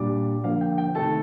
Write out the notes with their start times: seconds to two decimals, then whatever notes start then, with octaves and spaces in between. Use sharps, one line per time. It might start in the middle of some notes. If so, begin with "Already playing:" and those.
Already playing: A#2 G3 D4 D5 D6
0.44 D3 F3 A#3 F5
0.61 G5
0.78 G5
0.95 C3 D#3 A3 A4 A5